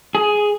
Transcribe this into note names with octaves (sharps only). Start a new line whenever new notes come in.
G#4